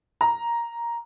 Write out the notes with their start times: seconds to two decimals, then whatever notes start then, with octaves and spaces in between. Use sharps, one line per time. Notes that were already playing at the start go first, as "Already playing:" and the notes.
0.21 A#5